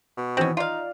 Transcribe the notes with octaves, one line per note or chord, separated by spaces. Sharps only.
B2
D#3 E3 C4 C#4 D#4
D#4 F4 D5 F5